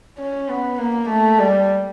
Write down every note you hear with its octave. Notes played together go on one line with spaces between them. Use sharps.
C#4
B3
A#3
A3
G3